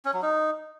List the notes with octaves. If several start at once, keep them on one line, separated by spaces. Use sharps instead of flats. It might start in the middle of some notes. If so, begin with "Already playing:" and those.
C#4
F#3
D#4